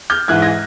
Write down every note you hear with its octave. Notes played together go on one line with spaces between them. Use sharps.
F6 G6
G#2 E3 F#6 G#6
G#6 A#6